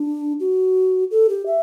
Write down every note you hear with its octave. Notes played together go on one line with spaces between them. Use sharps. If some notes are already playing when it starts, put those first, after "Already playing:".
Already playing: D4
F#4
A4
G4
E5